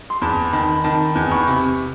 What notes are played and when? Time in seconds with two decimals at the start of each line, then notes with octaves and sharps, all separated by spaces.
0.10 C6
0.22 E2 A5 B5
0.53 D#3 A5 B5
0.84 D#3 A5 B5
1.16 E2
1.31 B5 C#6
1.47 C3